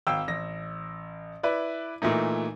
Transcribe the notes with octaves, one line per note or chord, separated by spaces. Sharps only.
G#1 F5 G5 E6
A1 A#6
E4 B4 D5
A#2 E3 A3 D#4